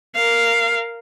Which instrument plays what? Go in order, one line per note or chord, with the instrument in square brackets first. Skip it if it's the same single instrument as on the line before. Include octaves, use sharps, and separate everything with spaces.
[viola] A#4 F5